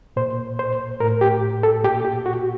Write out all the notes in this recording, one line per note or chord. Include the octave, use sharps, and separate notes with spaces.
A#2 C5
C5
A2 A#4
G4
A4
A#2 G4
G4
F#4